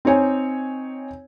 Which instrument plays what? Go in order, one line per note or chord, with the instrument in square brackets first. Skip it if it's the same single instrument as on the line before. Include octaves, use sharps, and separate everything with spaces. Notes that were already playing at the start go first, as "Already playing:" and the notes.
[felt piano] C4 D#4 C#5 G#5